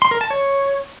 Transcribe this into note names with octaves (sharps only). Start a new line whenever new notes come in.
C6
A#4
A5
C#5